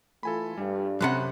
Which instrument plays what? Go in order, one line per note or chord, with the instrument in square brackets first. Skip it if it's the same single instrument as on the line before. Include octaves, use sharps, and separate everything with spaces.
[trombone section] E3 A3 F4 [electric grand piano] A4 G#5 B5
[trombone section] G2 [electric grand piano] G3
[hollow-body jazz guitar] F#2 C3 F#5 [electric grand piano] B5 F#6